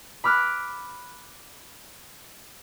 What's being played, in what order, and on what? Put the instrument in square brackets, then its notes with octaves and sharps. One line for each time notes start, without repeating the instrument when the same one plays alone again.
[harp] B5 D6 F6 F#6